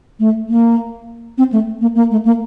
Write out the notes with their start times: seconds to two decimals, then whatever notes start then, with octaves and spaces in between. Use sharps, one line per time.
0.20 A3
0.49 A#3
1.38 C4
1.53 A3
1.81 A#3
1.96 A#3
2.11 A3
2.25 A#3